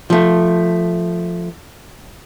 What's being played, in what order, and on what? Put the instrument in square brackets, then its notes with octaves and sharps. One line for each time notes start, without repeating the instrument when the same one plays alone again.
[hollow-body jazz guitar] F3 A3